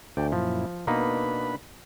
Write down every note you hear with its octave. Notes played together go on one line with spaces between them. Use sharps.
D2 D5 G5
F#2 A#2 F3 E4
B2 A#3 D4 D#4 B4 B5